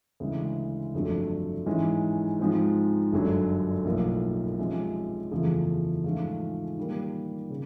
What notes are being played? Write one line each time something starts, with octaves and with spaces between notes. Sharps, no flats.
D2 C#3 E3 G#3
G1 F2 D3 F#3 A3
G#2 E3 G#3 C#4
G#2 F3 G#3 C4
G1 F#2 D3 F#3
B1 A2 F3 A#3
C3 F3 G#3 C#4
F#1 E2 C#3 F3 A3
G#2 F3 A3 C#4 F4
D#3 G3 A#3
C#3